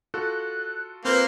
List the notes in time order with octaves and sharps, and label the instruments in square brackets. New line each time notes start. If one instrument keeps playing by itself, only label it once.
[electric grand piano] F4 F#4 A4 [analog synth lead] F#6
[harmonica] A#3 C5 F5 [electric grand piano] C4 F4 [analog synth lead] B4